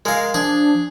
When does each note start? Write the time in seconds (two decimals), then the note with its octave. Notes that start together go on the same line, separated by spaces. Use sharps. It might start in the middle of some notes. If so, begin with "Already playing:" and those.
0.05 G#3 A#4 F5
0.34 F3 D4 G#4